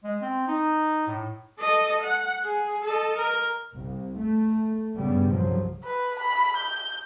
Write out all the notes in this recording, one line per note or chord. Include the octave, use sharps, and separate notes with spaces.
G#3
C4
D#4
A2
A4 D#5
F#5
G#4
A4 D#5
A#4
C2
A3
G2 C#3 G3 B3
C2 G2 C#3 F3 F#3
B4
B5
G6